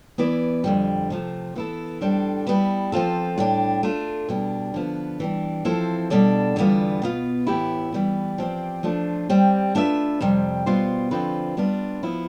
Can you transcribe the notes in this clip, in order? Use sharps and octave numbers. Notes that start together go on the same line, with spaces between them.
E3 B3 E4 B4 D5
F2 D3 G3
C3 F3 A3
E3 B3 E4 A4
A2 G3 D4 A4 C5
G3 B3 E4 B4
F3 C4 F4 A4
A2 G3 D4 G4
A3 D4 F4
B2 G3 D4
D3 F3 B3
E3 G3 D4
F3 C4 E4 A4 C5
B2 G3 D4 A4 D5
E2 D3 G3 B3 F4
B2 B3 F4
A2 E3 B3 E4 G4
E3 G3 B3
F3 C4 G4 D5
F3 A3 D4 F4
G3 C4 G4
A3 D4 F4 B4 E5
F2 C3 G3
B2 G3 B3 F4 C5
D3 F3 C4 F4 B4
G3 B3 D4 F4
F3 B3 E4